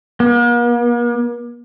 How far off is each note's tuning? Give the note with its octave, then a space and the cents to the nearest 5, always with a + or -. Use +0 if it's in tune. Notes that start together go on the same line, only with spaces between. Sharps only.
A#3 +45